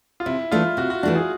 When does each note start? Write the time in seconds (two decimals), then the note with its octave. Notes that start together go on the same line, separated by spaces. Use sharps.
0.20 F4
0.26 C3 E4
0.52 E3 A3 D4 F4
0.77 C3 F#4
0.90 F#4
1.03 E3 A3 D4 F#4
1.15 G#4